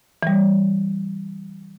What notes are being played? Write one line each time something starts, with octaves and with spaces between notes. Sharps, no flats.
E3 G3